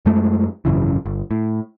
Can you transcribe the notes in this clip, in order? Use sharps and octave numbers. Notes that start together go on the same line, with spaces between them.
F#2 G#3 A3
G#1 F#2 C#3 E3
G1
A2